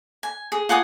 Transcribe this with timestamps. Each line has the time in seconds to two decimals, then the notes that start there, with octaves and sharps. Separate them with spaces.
0.23 G#5
0.52 G#4
0.69 F4 F#5 G#5 D#6